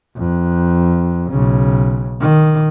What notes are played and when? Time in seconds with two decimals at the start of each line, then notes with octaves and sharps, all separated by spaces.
0.16 F2
1.29 B1 C#3
2.21 D#3